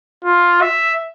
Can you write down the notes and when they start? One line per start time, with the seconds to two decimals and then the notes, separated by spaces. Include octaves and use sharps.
0.25 F4
0.61 E5